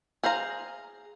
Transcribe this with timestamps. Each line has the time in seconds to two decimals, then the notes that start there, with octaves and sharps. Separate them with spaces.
0.23 G#4 C5 F5 A#5